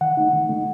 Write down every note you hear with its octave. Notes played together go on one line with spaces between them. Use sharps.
D#3 F#5
A3 D#4
D#3
A3 D#4